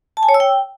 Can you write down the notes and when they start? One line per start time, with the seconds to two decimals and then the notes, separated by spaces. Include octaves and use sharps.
0.17 A5
0.23 G#5
0.29 C#5
0.34 E6
0.40 G5